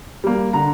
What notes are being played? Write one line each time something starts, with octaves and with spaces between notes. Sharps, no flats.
G3 A#3
D3 A#5